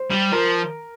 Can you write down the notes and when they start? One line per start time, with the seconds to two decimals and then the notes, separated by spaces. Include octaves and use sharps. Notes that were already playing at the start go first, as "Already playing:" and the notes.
Already playing: C5
0.11 G3
0.32 F3 A#4